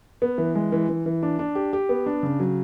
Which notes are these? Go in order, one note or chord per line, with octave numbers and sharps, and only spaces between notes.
B3
E3
G#3
E3
E3
E3
D4
D4
G4
G4
B3
D4
C#3
F#3